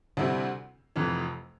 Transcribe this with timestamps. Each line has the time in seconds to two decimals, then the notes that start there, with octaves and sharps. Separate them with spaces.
0.17 D2 C3 G3 C4 E4
0.96 F1 F2 E3